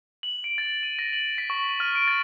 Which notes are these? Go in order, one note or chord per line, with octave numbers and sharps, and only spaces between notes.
F#7
D7
A6
D#7
A#6
F#7
B6
C#6
D#7
F6
D7
A6